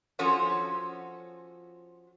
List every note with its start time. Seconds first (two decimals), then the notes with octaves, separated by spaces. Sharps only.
0.19 F3 C#4 F4 F#4 A4 C#5